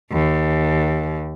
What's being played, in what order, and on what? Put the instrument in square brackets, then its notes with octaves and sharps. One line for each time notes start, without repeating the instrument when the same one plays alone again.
[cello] D#2